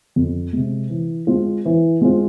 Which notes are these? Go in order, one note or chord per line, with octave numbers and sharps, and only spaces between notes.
F2
C3 G#3
E3
G#3 C4 F4
E3
G#3 C4 F4